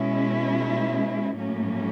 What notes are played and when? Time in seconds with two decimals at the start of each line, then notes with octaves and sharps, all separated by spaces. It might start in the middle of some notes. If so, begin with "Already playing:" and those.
Already playing: B2 G#3 C#4 E4
1.37 A2 F#3 A#3 C#4